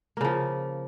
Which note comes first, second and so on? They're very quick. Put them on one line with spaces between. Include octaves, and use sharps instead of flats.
A#3 C#3 F3